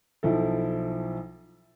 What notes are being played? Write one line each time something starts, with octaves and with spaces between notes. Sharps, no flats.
B1 F3 E4 A4